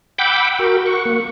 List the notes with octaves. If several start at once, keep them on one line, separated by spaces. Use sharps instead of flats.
F#5 G5 B5 D6 E6 G6
F#4 A#4
F#5 C#6
A#3